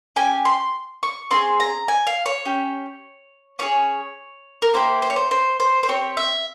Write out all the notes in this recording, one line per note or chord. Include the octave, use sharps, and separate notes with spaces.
C#4 G4 G#5
C6
C#6
C4 F4 G#4 C6
A#5
G#5
F5
C#5
C#4 G4
C#4 F4 G#4 C#5
A#4
A#3 E4 G4 C5
C5
C#5
C5
C5
C5
C5
C4 G4 C#5
E5